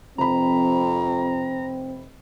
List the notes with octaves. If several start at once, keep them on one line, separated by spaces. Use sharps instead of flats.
F1 F2 C4 A#5 B5